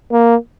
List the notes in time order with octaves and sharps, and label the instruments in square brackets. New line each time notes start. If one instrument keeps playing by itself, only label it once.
[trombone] A#3